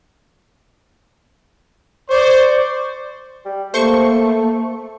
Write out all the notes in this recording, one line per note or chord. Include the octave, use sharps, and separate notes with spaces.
C5 D5 C#6
G3
A3 A#3 C5 C#6